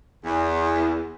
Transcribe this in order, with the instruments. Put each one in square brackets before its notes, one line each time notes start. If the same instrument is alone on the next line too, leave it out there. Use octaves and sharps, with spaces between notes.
[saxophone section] E2